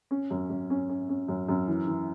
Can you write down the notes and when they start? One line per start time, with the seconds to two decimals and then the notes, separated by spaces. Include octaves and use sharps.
0.11 C#4
0.31 F#2
0.50 F#2
0.70 C#4
0.89 C#4
1.09 C#4
1.28 F#2
1.49 F#2
1.68 E3
1.87 E3